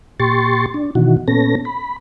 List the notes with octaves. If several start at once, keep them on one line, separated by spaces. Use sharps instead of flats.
A#2 G4 C6 C#6 A6
D4
B2 D#3 E3 F#4
A#2 B3 C#4 A4 A#6
B5